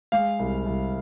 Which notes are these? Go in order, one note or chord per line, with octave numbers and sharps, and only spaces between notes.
G#3 F5
C2
C2